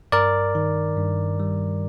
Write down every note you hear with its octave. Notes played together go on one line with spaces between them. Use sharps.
G2 A#4 D5
D#3
G2
G3